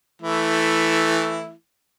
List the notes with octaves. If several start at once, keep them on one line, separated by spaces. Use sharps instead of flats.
E3 A3 E4